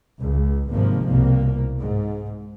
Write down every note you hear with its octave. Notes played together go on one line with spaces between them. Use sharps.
C#2
G#1 G#2 C3 F3 A#3
C2 B2 A#3
G#2